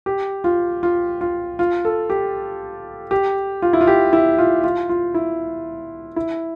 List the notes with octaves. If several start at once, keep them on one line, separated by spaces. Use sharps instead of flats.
G4
F4
F4
F4
F4
A4
G4
G4
F4
E4
F4
G4
E4
F4
F4
F4
E4
E4